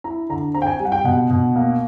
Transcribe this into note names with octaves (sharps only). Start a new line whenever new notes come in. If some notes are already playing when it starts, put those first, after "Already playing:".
E4 A#5
D3 A#5
C4 A#5
G5
G#5
G3
F#5
G5
B2 F#5
B2
A#3